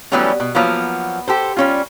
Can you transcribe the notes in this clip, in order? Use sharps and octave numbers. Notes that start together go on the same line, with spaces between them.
E3 F#3 G3 A3 B3 C#4
B2
F3 F#3 A#3 B3
G4 A4 C5
G3 C#4 F4